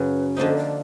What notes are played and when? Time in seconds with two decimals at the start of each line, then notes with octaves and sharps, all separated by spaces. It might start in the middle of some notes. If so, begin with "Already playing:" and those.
Already playing: F#2 C#3 F#3 B4
0.36 D3 F3 A#3 D#4 C5
0.57 D5